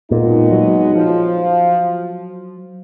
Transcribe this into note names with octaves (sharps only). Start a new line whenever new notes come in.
A#2 G#3 B3 D#4
F#3
F3